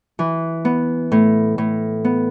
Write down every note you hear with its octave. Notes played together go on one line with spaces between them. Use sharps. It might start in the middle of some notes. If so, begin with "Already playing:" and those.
E3
B3
A2
A2
B3